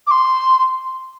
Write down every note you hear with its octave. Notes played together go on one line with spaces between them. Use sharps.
D6
C6